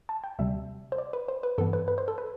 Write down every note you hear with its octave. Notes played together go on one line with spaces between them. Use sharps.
A5
G5
D2 C3 G3 E5
C5
D5
B4
C5
B4
G2 E3 B3 A4
B4
B4
C5
A4
B4